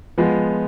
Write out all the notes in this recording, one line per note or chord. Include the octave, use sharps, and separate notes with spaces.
F3 G#3 B3